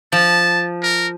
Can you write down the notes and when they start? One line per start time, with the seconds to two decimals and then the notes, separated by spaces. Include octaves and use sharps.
0.12 F3 A5
0.83 A#4